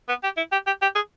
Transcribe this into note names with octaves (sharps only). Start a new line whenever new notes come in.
B3
G4
E4
G4
G4
G4
G#4